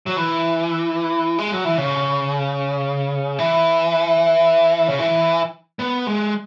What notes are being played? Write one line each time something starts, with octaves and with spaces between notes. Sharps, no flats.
F#3
E3
G#3
F#3
E3
C#3
E3
C#3
E3
B3
G#3